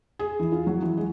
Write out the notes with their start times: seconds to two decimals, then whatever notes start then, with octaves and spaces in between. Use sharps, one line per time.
0.19 G#4
0.39 E3
0.52 F4
0.67 F#3
0.82 E3
0.97 G#3